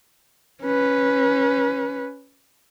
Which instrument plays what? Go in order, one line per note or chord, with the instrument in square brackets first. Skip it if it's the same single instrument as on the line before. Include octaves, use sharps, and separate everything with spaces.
[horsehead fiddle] C#4 B4